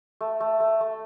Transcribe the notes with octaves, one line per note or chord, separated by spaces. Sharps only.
A3
A3
A3
A3